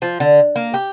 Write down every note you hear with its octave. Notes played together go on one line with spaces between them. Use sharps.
F3
D3
A#3
G4